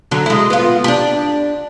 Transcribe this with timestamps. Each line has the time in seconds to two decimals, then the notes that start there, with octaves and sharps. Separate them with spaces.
0.11 D3 F#3
0.26 G#3 E4
0.50 B3 F4
0.84 D4 G4